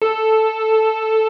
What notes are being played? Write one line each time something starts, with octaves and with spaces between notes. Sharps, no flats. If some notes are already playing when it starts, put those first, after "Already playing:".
A4